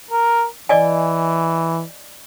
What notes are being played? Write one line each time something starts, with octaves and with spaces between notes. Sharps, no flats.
A#4
E3 D5 D#5 G#5